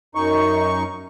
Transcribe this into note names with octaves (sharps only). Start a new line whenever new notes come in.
F#2 D#4 C#6